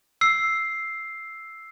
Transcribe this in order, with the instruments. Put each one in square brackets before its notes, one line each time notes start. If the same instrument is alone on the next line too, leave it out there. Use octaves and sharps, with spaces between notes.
[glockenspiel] E6 C7